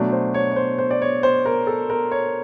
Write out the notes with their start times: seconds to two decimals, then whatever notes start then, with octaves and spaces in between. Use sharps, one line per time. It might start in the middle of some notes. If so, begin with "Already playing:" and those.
Already playing: B2 F#3 A3 D4
0.12 C5
0.34 C#5
0.52 C#5
0.56 C5
0.78 C5
0.91 D5
1.02 C#5
1.23 C5
1.46 A#4
1.67 A4
1.90 A#4
2.11 C#5